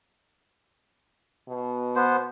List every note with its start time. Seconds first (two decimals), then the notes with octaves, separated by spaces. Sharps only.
1.48 B2
1.96 B3 C5